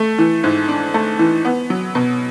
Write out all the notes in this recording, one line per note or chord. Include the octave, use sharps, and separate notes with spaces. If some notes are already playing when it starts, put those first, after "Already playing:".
Already playing: A3
E3
G#2
D4
A3
E3
B3
F#3
B2